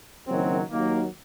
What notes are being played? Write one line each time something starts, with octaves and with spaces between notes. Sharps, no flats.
F#1 F#2 D#3 F#3 C4
D#2 D#3 F#3 A#3